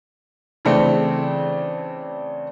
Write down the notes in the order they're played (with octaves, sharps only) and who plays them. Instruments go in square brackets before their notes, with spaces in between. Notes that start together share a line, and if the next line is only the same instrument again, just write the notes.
[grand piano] C#3 E3 A3 C4 D4